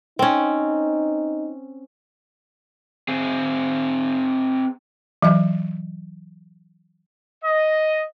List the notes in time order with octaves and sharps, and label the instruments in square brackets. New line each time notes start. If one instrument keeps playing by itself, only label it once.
[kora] C4 C#4 [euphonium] D#4
[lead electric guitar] C4 G#4
[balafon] E3 F#3 D#5
[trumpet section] D#5